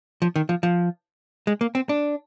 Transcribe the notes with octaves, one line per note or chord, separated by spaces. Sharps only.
F3
D#3
F3
F3
G#3
A#3
C4
D4